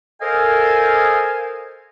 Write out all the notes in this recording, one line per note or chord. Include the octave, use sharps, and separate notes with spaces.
A4 A#4 C5 D#5 F5 G#5